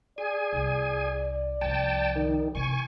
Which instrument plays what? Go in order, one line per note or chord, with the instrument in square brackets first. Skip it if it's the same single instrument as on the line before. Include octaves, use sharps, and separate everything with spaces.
[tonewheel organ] G#4 G#5 [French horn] D5
[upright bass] C2
[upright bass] C2 F3 [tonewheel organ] G5 A5
[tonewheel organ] D#3
[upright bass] C3 E3 [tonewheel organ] G#5 C#6